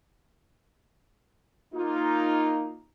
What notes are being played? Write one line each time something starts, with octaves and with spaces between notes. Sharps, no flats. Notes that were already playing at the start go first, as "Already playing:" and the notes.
A#3 D#4 F4